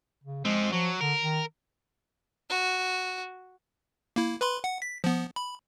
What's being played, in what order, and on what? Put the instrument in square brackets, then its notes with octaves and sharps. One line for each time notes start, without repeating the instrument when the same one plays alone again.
[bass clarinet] C#3
[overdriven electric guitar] F3 C4 [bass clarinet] G#3
[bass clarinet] F3 [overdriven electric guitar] F#3
[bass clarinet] D3 [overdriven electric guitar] A#4
[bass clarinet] D#3
[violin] F#4
[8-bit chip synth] A#3 E4
B4 B5 C6
F#5
B6
F3 B3
B5